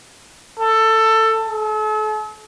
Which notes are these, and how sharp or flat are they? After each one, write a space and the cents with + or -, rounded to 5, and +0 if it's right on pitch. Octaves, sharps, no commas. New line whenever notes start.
A4 +15
A4 -40